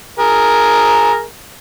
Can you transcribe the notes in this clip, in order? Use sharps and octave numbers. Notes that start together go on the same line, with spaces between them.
G#4 A#4